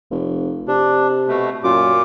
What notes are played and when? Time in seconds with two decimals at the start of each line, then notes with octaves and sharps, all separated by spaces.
0.11 F1
0.68 C3 D4
1.28 B2 A3
1.64 F#2 A#2 F4 D6